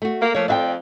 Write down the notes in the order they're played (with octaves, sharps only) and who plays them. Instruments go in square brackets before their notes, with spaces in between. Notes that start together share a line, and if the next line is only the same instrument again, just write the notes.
[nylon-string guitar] A3 F#4
[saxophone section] A#3
[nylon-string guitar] F3 C#5 [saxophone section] A3 A#3
[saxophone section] F2 [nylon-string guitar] D5 E5 G5